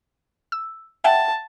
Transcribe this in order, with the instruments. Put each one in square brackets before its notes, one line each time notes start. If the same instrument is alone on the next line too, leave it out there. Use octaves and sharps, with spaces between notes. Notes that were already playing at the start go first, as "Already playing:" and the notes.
[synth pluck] E6
[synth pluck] E5 F#5 G5 [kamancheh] A5